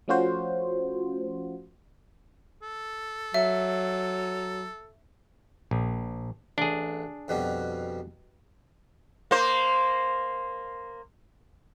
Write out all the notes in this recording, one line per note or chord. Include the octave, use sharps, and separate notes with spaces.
F3 A3 C#4 F4 F#4 C5
A4
F#3 E5
A#1
A1 D4 G#4
F2 B2 G3
A#3 C5